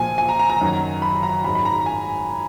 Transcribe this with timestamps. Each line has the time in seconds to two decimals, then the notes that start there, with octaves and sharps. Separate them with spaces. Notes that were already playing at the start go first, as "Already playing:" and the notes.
Already playing: A#2 F3 G#5
0.18 G#5
0.29 A#5
0.39 A#5
0.50 A#5
0.61 F#2 D#3 F#3
1.02 B5
1.23 A#5
1.44 G#2 F#3 B5
1.55 B5
1.65 A#5
1.86 G#5